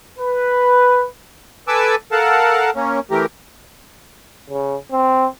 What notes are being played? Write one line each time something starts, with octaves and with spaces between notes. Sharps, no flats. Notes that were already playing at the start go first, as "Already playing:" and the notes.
B4
A4 B4 G#5 A5 D6 E6
A4 A#4 F5 F#5 A5
A#3 C#4
E3 A3 G4 A#4
C#3
C4